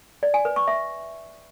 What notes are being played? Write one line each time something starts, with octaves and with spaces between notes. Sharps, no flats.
D5
G#5
B4
C#6
E5